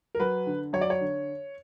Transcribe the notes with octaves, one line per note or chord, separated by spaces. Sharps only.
A#4
F#3 B4
D3
F#3 C#5
D5
C#5
D3